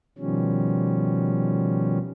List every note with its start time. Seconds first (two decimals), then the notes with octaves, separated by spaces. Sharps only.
0.18 B2 D#3 F3 G3 C#4